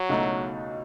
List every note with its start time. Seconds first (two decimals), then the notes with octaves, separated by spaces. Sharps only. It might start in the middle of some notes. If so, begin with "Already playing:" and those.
Already playing: F#3
0.09 C#2 B2 A3 D#4